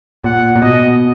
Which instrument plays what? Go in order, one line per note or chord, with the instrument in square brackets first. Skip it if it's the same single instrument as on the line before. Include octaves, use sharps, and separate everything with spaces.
[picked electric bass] A#2 [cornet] F#5
[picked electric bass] A#2
[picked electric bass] B2 [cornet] D#5